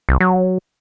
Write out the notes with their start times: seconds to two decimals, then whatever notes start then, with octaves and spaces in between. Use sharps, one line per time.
0.09 C2
0.20 F#3